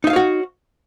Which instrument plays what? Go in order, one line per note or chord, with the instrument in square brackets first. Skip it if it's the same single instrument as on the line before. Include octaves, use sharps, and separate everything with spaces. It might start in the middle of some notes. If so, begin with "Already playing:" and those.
[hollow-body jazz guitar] D#4
E5
F5
C#5
F#4